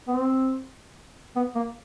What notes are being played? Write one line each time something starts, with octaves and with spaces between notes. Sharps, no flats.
B3
C4
B3
A#3